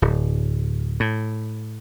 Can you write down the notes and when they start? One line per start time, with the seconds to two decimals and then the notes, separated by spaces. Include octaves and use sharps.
0.02 D1
1.00 A2